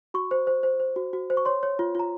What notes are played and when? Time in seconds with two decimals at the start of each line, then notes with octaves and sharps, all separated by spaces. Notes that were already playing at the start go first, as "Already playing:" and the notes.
0.14 F#4 C#6
0.31 C5
0.47 C5
0.63 C5
0.80 C5
0.96 F#4
1.13 F#4
1.30 C5
1.37 C#6
1.45 C#5 C6
1.63 C#5
1.79 F4
1.95 F4 A#5